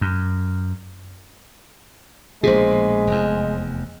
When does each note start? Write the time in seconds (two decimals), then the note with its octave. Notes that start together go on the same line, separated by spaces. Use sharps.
0.01 F#2
2.43 A#1 B2 G#3 G#4 C5
3.07 F1 E2